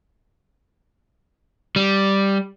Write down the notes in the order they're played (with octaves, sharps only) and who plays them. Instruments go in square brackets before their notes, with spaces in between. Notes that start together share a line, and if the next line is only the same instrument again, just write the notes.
[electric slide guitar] G3